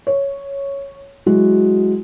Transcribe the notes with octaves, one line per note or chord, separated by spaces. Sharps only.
C#5
F#3 G#3 E4 F#4